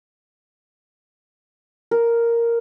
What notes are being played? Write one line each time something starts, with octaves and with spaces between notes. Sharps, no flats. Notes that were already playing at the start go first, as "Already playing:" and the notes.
A#4